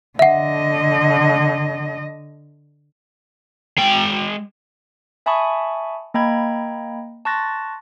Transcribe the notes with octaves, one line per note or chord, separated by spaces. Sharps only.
D3 D#5 E5 F#5
G#3 G5
E5 G#5 A5 B5 C#6 D#6
A#3 D#5 G5 A#5 B5 G#6
A5 C6 C#6 F#6 A6 A#6